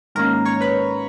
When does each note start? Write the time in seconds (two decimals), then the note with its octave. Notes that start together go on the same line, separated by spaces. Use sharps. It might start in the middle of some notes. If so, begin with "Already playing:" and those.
0.15 G#2 D#3 A#3 C#4 A#4 A#5
0.45 C#5 C#6
0.61 B4 B5